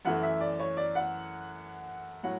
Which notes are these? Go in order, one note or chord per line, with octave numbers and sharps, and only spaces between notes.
F#2 E3 A3 F#5
E5
D5
C#5
D5
F#5
A2 F#3 F#5